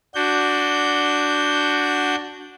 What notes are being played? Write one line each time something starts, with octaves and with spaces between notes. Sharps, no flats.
D4 F#4 G6